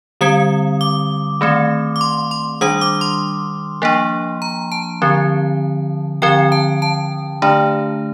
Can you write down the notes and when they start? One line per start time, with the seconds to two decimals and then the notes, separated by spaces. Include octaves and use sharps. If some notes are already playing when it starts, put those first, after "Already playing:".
0.21 D3 G3 C4 D#6
0.81 D6
1.41 D#3 A3 C4
1.96 D6
2.01 C6
2.31 C6
2.61 D#3 G3 D4 D#6
2.81 D6
3.01 C6
3.82 F3 A#3 D4
4.42 A#5
4.72 A5
5.02 D3 F3 C4
6.22 D3 F3 C4 G5
6.52 A5
6.82 A5
7.42 D3 A3 D4